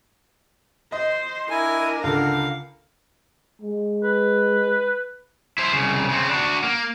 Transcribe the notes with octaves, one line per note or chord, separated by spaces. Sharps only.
C5 D#5
D4 E4 A#4 G#5
C#2 D3 A4 F5
G#3
B4
E4 C5
C2 C#3
C#3 C4
D4 F#4
A#3